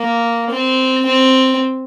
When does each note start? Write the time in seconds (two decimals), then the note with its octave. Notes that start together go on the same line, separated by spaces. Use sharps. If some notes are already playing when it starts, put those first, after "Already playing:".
Already playing: A#3
0.50 C4
1.05 C4